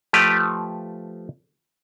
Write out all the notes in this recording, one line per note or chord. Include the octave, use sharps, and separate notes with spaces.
F3 A3 G4 B4